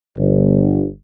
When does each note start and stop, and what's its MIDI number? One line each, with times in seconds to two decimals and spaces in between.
0.17 0.86 31